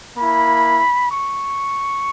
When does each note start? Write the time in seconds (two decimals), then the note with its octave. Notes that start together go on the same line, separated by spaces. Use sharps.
0.17 A#3 E4 B5
1.10 C#6